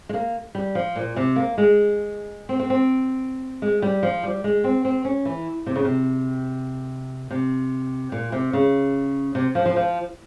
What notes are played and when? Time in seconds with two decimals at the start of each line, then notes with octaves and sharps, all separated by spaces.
0.09 G#3
0.14 A#3
0.55 G3
0.75 F3
0.96 A#2
1.16 C3
1.36 A#3
1.58 G#3
2.49 C4
2.59 C4
2.70 C4
3.62 G#3
3.82 G3
4.03 F3
4.23 G3
4.44 G#3
4.64 C4
4.85 C4
5.05 C#4
5.25 E3
5.67 C3
5.76 C#3
5.84 C3
7.31 C3
8.12 A#2
8.32 C3
8.53 C#3
9.35 C3
9.55 F3
9.66 F3
9.76 F3